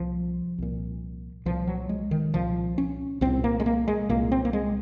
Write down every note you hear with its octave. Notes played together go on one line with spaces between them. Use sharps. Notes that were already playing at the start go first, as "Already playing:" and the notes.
Already playing: C2 A#2 F3
C2 A#2
C2 A#2 F3
F#3
G#3
D#3
C2 A#2 F3
C#4
C2 A#2 C4
A#3
G#3
A#3
G#3
C2 A#2 A#3
C4
A#3
G#3